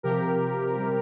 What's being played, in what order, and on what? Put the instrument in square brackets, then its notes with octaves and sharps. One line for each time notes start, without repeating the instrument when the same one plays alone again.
[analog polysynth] C3 F3 G4 A#4
C3 G3